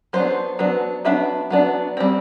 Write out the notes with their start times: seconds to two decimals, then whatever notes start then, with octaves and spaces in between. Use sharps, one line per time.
0.13 F#3 B3 D4 C5
0.59 F#3 B3 D4
1.05 F#3 B3 D4 E5
1.50 F#3 B3 D4
1.97 G3 C4